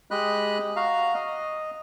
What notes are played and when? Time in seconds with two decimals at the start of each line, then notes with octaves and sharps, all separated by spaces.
0.11 G#3 G4 D#5 B5 F#6
0.76 F#4 F5 A#5
1.15 D#5